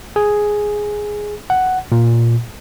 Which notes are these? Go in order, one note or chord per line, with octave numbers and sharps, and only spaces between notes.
G#4
F#5
A#2